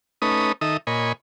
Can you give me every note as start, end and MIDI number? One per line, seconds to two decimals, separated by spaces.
0.22 0.52 57
0.22 0.52 61
0.22 0.52 63
0.22 0.52 71
0.22 0.52 87
0.61 0.77 51
0.61 0.77 63
0.61 0.77 69
0.61 0.77 76
0.61 0.77 87
0.87 1.12 46
0.87 1.12 73
0.87 1.12 75
0.87 1.12 80
0.87 1.12 83